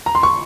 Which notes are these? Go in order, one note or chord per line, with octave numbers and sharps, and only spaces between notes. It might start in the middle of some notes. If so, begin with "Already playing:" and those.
A#5
C6
C#6